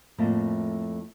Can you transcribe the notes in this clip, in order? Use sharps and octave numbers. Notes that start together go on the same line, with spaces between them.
F2 A2 A3 A#3